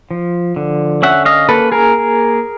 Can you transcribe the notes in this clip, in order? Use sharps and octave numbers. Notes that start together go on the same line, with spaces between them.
F3
D3
C#4 E5 F#5
D#5 F5
A#3 A4 B4
G#4 A#4